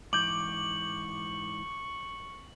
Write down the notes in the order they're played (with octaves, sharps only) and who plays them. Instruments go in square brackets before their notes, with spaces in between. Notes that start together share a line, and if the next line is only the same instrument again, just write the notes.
[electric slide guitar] G#2 E3 [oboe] C#6 [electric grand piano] D6 G6 [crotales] F#7